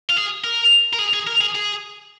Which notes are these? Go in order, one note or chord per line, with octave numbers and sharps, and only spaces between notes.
F4
G#4
A#4
A#4
G#4
G#4
A#4
G#4
G#4